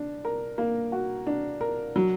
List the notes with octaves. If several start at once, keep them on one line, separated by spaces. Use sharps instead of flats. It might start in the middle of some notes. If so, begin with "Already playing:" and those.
Already playing: D4
A#4
A#3
F#4
D4
A#4
F#3